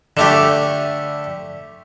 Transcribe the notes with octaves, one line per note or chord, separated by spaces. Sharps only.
D3 A3 G4